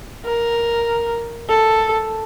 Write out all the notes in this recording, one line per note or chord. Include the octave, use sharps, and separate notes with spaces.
A#4
A4